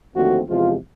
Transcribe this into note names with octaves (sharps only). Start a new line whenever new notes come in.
D#2 D3 F3 A3 C4 F#4
E2 C3 F3 G#3 F4